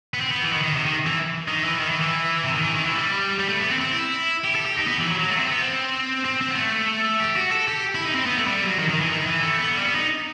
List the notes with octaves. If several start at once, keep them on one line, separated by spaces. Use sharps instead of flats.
B3
C4
B3
E3
D#3
D#3
C3
D#3
E3
D#3
E3
D#3
E3
E3
C3
D#3
E3
D#3
E3
G3
G3
A3
B3
C4
C4
E4
G4
A4
G4
D#4
B3
E3
F#3
F#3
A3
C4
B3
C4
C4
C4
B3
A3
G4
F#4
A4
G4
E4
D#4
C4
B3
A3
G3
F#3
D#3
D#3
E3
D#3
E3
A3
B3
G3
C4
B3
D#4